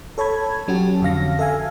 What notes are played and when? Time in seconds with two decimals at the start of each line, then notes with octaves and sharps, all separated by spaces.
0.18 A4 C#5 A5 B5 G#6
0.68 F#3 C#4 F#4 G4 A5
1.02 F2 D3 F5 A#6
1.39 A4 E5 F5 G#5